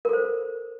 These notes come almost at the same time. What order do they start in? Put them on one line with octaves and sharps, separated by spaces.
A#4 A4 C5